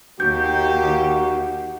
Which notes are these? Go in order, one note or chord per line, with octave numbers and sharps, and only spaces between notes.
D#2 A#3 F#4 G4 G6